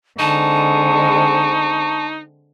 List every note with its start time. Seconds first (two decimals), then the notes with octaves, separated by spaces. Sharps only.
0.19 D3 G#3 C4 D#4 A5 C#6